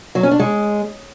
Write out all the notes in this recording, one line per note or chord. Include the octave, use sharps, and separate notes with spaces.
F#3
C#4
D4
G#3